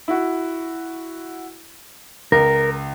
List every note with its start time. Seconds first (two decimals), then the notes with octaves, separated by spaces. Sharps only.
0.08 E4 F#4
2.32 C#2 A#4